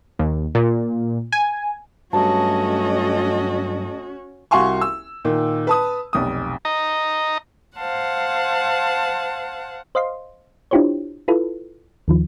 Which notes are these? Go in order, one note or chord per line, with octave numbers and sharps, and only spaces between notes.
D#2
A#2
G#5
G2 F#3 A3 C#4 F#4 D#5 A5
C2 F#4 F5 G#5 C6 C#6
E6
A#2 D#3
B4 A5 D#6
F1 B1 D#6
D#5 A#5
C5 F5 F#5 A5
C5 D#5 F5 C6
D4 E4 F4 G4 C5 C#5
E4 F4 A4 B4
D#2 D#3 F3